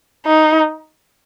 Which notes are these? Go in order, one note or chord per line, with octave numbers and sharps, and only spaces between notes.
D#4